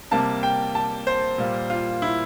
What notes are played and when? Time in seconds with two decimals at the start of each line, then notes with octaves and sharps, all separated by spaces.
0.11 C3 G3 A#3 A5
0.43 G5
0.75 A5
1.07 C5
1.38 A#2 G3 A#3
1.70 F4
2.02 E4